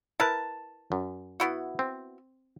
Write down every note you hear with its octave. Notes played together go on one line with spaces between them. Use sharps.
E4 A#4 B4 A5
F#2
B3 E4 F#4
C4